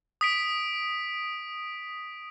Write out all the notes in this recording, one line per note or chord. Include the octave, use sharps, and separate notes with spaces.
D#6 B6 D7